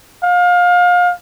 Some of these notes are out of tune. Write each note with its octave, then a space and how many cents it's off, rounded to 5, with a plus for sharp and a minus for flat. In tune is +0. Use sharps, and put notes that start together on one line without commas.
F5 +30